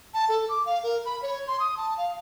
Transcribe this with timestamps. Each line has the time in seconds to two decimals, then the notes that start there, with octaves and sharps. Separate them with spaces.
0.14 A5
0.29 A4
0.49 D6
0.66 F5
0.83 A#4
1.05 B5
1.22 C#5
1.48 C6
1.60 D#6
1.77 A5
1.97 F5